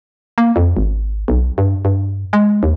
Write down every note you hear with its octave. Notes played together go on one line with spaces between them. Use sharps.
A#3
F2
G#1
B1
G2
G2
G#3
D#2